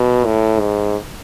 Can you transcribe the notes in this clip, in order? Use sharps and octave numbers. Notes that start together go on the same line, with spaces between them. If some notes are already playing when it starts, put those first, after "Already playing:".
Already playing: B2
A2
G#2